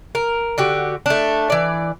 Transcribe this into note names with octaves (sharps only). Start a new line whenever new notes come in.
A#4
D3 F#4 G4
A3 D4
E3 D5